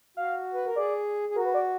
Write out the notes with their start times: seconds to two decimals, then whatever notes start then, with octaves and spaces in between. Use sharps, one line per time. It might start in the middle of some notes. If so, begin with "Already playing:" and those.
0.17 F#4 F5
0.54 B4
0.66 A#4
0.76 G#4 D5
1.29 G#4
1.35 F#4 A#4
1.45 B4
1.54 D5